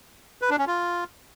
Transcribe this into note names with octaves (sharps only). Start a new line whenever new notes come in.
B4
D4
C#4
F4